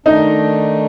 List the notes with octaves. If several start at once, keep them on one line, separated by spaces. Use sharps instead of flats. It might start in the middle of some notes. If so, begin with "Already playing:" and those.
D#3 A3 D4 D#4